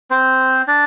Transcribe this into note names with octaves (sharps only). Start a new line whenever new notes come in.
C4 C5
D4 D5